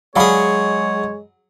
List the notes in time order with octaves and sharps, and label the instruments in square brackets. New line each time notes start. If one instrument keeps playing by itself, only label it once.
[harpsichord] F#3 G#4 [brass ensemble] G#3 [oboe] C#5 [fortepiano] D5 F5 B5